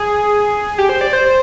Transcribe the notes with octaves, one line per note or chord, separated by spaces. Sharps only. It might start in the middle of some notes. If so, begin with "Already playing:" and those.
Already playing: G#4
G4
C5
D5
C5